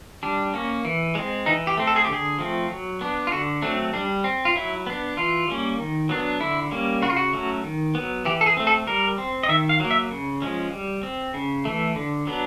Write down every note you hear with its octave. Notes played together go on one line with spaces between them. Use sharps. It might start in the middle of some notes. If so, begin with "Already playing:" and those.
G3 D4
A#3 C#4
E3
G#3 C4
E3 D#4
G4
A3 C4
A4
G#4
G4
D3 G#4
F3 A3 C4
F#3
B3 D4
F4
D3 F#4
F#3 A3 C4 D4
G3 D4
C4
F4
F#3 E4
B3 D4
E3 F4
G3 A#3 C#4
D#3
F#3 B3 D4
D3 E4
G3 A#3 C#4
C#3 F#4
F4
F#4
F#3 A3 C#4
D#3
F#3 B3
E3 G4
A4
G#4
A3 C4
A4
G3 A#4
C4
D#5
D#3 E5
F5
F#3 A#3
E5
C#3
F3 G#3 C#4
G3
C4
C#3
E3 A3
D3
F#3 B3 D4